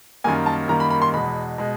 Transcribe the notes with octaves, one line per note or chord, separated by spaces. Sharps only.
F#2 D#3 G3 A#3 G#5
A5
F#2 D#3 G3 A#3 A#5
B5
B5
C6
E2 B2 G#3 B5
B2 G#3